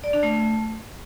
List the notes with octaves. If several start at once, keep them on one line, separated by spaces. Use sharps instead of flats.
D5
D4
A3